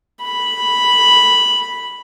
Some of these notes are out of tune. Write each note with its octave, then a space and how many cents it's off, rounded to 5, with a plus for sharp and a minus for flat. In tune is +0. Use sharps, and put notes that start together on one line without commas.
B5 -5